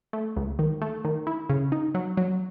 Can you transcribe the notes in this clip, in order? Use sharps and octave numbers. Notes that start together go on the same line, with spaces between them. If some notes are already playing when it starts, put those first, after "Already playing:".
A3
C#2
D#3
A3
D#3
E4
C#3
D#4
F#3
F#3